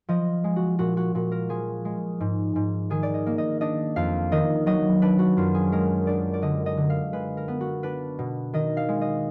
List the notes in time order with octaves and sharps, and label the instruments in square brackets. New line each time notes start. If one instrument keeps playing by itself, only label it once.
[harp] F3 D#5
G#3
F#4
A#2 F#4
F#4
A#2 F#4
A#4
F3 G#4
G#3
G#2
G#2
D#3 G#4
D5
D#5
A#3
D#5
D4 D#5
F2 F5
D#3 D#5
F#3 D#5
D4 B4
F#4
F#2 F4
G#4
G#3 A#4
D4 D5
D5
D3 D#5
D#5
D3
F5
G#3 B4
A#4
B3
F#4
D4 B4
B2
D#3 D#5
F5
G#3
D#5